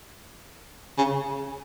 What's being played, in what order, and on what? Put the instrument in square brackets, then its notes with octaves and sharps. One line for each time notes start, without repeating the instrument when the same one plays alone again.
[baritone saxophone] C#3